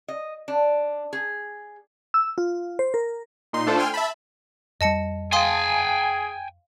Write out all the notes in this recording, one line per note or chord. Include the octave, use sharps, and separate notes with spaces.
D#5
D4
G#4
E6
F4
C5
A#4
A#2 D#4 C6
A3 D4 F4 A4 C5
G5 G#5 C6 F6
E5 A5 B5
F2 G3 D#5 A5 C#7
G#4 F5 G5 G#5 C6 D#6